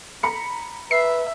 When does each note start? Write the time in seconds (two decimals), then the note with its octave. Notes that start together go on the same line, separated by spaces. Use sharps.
0.23 A#5 B5 C#7
0.91 B4 E5 C7